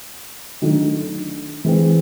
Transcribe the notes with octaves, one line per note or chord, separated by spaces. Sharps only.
D#3 F#3 A3 D4
E3 G#3 C4